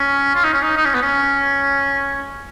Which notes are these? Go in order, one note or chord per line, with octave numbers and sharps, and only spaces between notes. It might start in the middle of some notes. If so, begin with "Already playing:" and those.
Already playing: C#4
F4
D#4
C#4
D#4
D#4
C#4
B3
C#4